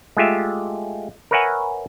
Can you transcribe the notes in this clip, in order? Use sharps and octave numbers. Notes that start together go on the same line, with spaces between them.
G#3 A3 F4 G4 E5
A#4 B4 C#5 E5 F#5 G#5